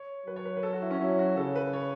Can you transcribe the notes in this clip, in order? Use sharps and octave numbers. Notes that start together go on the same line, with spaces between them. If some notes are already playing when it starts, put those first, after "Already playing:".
Already playing: C#5
F#3 B4
C#5
B4
B4
A4
F#4
E4
C#4
F#3 E4
F#4
C#3 A4
B4
C#5